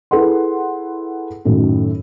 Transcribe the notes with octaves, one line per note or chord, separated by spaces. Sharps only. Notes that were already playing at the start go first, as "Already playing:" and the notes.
E4 G#4 A4 B4 F#5 C6
F#2 A2 D#3